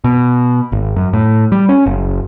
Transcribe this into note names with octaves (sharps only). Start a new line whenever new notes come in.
B2
G#1
F#2
A2
G3
C#4
F#1